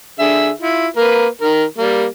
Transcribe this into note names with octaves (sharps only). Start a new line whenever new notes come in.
D3 G#4 E5
E4 F4
A#3 A#4 B4
D#3 A#4
G3 A#3